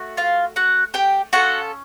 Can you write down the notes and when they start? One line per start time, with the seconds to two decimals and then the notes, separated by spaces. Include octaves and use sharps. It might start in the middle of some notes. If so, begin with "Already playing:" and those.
Already playing: A3 F#4
0.17 F4 F5
0.56 F#4 F#5
0.94 G4 G5
1.33 C#4 F4 F#4 A4 F#5